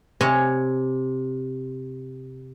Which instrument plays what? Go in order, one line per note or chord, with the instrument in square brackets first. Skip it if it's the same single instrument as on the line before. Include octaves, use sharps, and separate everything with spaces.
[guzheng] C3 C#5 D#5 G#5